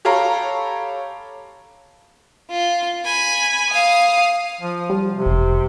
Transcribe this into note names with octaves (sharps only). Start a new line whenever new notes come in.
G4 A4 C#5 F5 A#5 B5
F4
G#5 B5
F5 D#6
F3
G3
C3
F1